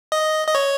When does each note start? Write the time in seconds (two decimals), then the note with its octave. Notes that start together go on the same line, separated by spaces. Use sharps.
0.12 D#5
0.47 D#5
0.55 C#5